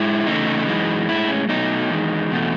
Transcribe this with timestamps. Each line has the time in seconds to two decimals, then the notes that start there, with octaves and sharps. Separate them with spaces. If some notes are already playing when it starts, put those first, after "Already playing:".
Already playing: G#2 G#3 E4
0.26 E2 C#3 A3 D#4
0.67 F#2 E3 G#3
1.08 A2 G#3 E4
1.29 C#4
1.49 B2 F#3 A3 D#4
1.90 E2 D#3 G#3
2.31 E2 B2 A3